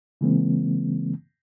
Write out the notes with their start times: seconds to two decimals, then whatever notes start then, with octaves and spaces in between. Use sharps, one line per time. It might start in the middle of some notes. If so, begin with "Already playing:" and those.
0.21 C#3 E3 G#3 A#3 C4